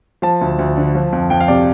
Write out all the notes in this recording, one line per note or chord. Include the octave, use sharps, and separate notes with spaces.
F3 A5
D2
D2
D3
F3
F2
F2 G5
F5
C3 D5